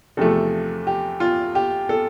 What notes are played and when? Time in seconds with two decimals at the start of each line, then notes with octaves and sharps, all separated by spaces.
0.17 E2 C3 F3 A3 A4
0.87 G4
1.20 F4
1.55 G4
1.89 A4